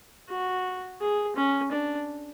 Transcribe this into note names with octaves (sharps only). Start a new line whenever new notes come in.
F#4
G#4
C#4
D4